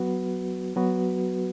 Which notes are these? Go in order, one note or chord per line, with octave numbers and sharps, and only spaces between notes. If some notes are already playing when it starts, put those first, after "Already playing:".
Already playing: F#3 B3 F#4 B4
F#3 B3 F#4 B4